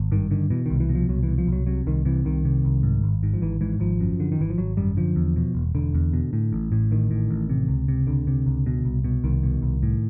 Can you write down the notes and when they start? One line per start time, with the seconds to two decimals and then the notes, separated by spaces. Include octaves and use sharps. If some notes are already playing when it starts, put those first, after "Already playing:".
Already playing: G#1
0.12 G2 D#3
0.31 D3 D#3
0.50 B2 E3
0.66 C2 D#3
0.80 E3
0.89 B2
0.95 F3
1.09 C2 F#3
1.23 E3
1.28 B2
1.38 F3
1.47 C2
1.52 F#3
1.67 C3 F#3
1.87 C2 D#3
2.05 C3 E3
2.25 C2 D#3
2.45 C3
2.65 C2
2.83 G#2
3.04 G#1
3.23 G#2
3.34 F3
3.42 G#1 E3
3.61 G#2 E3
3.80 G#1 F3
4.00 F#2
4.20 D3
4.32 D#3
4.39 G#1 E3
4.50 F3
4.58 G#1 F#3
4.77 F#2 G3
4.97 D3 F3
5.16 E2
5.36 B2
5.55 E1
5.75 E1 D3
5.94 E2
6.13 B2
6.33 A2
6.53 A1
6.72 A2
6.91 A1 D#3
7.11 A2
7.31 A1
7.49 C3
7.68 C#2
7.88 C3
8.07 C#2 D3
8.27 C3
8.46 C#2
8.66 B2
8.85 C2
9.04 B2
9.24 C2 D#3
9.43 B2
9.62 C2
9.83 A2